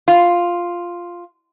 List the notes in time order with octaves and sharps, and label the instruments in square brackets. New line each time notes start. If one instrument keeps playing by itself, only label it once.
[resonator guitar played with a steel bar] F4